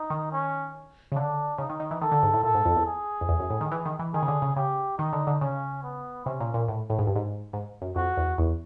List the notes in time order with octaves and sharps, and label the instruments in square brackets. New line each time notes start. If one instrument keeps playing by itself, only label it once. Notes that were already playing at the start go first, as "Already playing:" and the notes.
Already playing: [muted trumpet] D#4
[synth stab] D#3
[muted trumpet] C#4
[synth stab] C#3
[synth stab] D3 [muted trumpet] D4
[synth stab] C#3 [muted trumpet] D#4
[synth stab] D#3
D#3
E3
[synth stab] D#3 [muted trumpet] A4
[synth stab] D3
G#2
A2
[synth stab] A#2 [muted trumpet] A4
[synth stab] G#2
F2
E2
[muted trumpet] G#4
[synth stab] F2
E2
F#2
A2
D#3
E3
D#3
E3
[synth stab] D#3 [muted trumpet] G#4
[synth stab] C#3
D3
C#3
[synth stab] C#3 [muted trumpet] G4
[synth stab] D#3 [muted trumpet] D#4
[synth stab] D3
D3
[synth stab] C#3 [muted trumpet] C#4
[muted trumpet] B3
[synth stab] C3 [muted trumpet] C#4
[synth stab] A#2
A#2
A2
A2
G#2
G2
G#2
G#2
F#2
[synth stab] F2 [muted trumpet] F#4
[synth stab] E2
E2